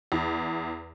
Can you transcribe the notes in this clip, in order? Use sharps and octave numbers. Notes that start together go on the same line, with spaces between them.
E2